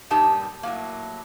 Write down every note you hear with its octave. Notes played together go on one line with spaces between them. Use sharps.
G2 A#2 G3 D#4 G4 A5
A2 F#3 A#3